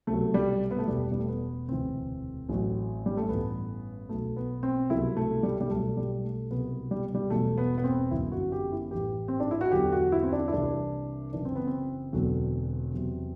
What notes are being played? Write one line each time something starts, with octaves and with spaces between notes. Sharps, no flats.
C2 B2 F#3 A3
G3
B3
A3
E1 E2 B2 G3
G3
A3
B3
E1 D2 C3 E3 C4
A1 A2 F#3
G3
A3
A1 G2 E3 B3
B1 B2 F#3 A3
B3
C4
C2 B2 F#3 E4
A3
G3
G3
B1 B2 F#3 A3
G3
A3
C2 B2 F#3 B3
G3
G3
E1 E2 B2 F#3 A3
B3
B3
C4
G1 F#2 E3 E4
F#4
G4
E4
A1 A2 E3 G4
C4
D4
E4
F#4
E2 D3 F#3 G4
F#4
E4
C4
D4
E4
C2 C3 E3 D4
F#1 F#2 E3 D4
C4
B3
C4
E1 E2 D3 F#3
E2 C3 F#3